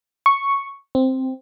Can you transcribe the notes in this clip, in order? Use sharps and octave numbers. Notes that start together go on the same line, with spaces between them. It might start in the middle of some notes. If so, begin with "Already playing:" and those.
C#6
C4